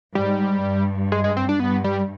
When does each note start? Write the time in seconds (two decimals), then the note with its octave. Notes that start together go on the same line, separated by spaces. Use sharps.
0.15 G#2 G3
0.63 G2
1.12 G#3
1.24 G#3
1.37 C4
1.49 D4
1.60 G2 B3
1.84 G3